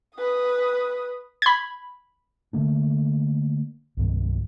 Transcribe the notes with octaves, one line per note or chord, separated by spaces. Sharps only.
B4 D#6
B5 G#6
D3 A3 A#3 D4
C2 G2 D#3